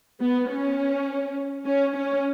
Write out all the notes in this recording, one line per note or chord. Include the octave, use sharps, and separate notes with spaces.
B3
C#4
C#4
C#4